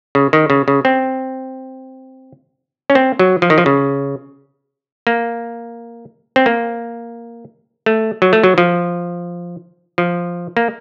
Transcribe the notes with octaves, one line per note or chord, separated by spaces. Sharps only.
C#3
D#3
C#3
C#3
C4
C#4
C4
F#3
F3
D#3
F3
C#3
A#3
C4
A#3
A3
F#3
A3
F#3
F3
F3
A#3